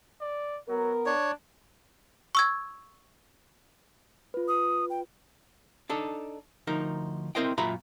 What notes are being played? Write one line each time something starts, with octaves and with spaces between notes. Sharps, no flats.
D5
F#3 B3 A#4
D4 C#5
C#6 E6 G#6
F4 B4
D#6
G5
D4 D#4 A4
D2 F3 D#4 A#4
C4 E4 A#4 C5 D#5 G5
F#2 A#2 F4 E5 A#5 B5